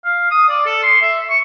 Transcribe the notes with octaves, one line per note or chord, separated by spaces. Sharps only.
F5
D#6
D5
A4
C6
E5
C#6